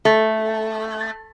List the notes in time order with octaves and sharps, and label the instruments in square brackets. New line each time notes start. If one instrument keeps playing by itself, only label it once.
[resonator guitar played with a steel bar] A3